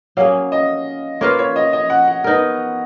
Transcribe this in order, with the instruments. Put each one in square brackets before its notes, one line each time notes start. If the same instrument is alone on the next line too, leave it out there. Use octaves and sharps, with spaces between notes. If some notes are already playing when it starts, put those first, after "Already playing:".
[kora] F#3 A#3 C#4 G#4 [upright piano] F5
[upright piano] D#5
[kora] A#3 F4 B4 F5 [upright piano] C#5
[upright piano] C#5
D#5
D#5
F#5
F#5
[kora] B3 D#4 A#4